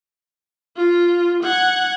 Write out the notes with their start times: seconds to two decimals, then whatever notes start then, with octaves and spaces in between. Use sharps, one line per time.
0.77 F4
1.43 F#5 G#6